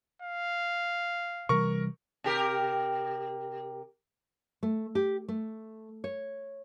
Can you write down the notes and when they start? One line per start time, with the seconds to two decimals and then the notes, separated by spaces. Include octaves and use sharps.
0.22 F5
1.49 C3 E3 G3 A#4 C#6
2.24 C3 G4 A#4
4.63 A3
4.95 G4
5.28 A3
6.04 C#5